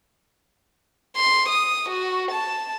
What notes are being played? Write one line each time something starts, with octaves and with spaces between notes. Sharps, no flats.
C6
D#6
F#4
A5